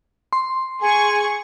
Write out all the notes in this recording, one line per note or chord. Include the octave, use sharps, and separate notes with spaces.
C6
G#4 G#5 C#6